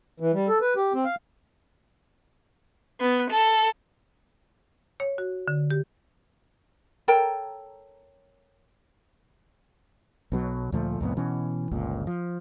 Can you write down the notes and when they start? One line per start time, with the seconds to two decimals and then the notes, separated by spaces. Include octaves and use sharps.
0.20 E3
0.33 G3
0.48 A4
0.61 B4
0.76 G4
0.94 C4
1.05 F5
3.00 B3
3.30 A4
5.00 C#5
5.18 F#4
5.48 D3
5.70 G4
7.08 A4 A#4 C#5 G5
10.32 B1 B2 F#3
10.72 D2 A#2 F3 A3
11.01 C2 F2 A2 B3
11.17 B2 E3 C#4
11.71 G1 C#2 A#2
12.07 F3